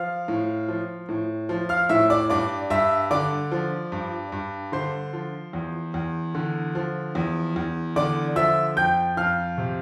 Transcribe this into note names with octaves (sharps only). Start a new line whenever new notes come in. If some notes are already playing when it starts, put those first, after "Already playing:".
Already playing: F3 F5 F6
A2
F3
A2
F3
F5 F6
A2 E5 E6
D5 D6
G2 D5 D6
G2 E5 E6
D3 D5 D6
F3
G2
G2
D3 C5 C6
F3
E2
E2
D3
F3
E2
E2
D3 D5 D6
F3 E5 E6
F2 G5 G6
F2 F5 F6
C3